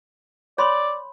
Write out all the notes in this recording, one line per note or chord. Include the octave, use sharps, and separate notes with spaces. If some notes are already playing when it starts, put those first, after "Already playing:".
C#5 D5 B5 C6